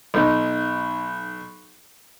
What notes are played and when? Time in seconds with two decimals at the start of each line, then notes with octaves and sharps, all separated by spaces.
0.14 B1 D#4